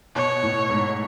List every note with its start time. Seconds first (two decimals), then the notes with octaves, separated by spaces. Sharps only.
0.15 B2 C#5
0.43 A2
0.70 G#2